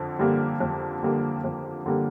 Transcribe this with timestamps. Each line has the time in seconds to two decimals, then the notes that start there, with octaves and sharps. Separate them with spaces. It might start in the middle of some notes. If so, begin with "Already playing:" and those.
Already playing: F2 D3
0.19 D3 G3 A#3
0.60 F2
1.03 D3 G3 A#3
1.44 F2
1.86 D3 G3 A#3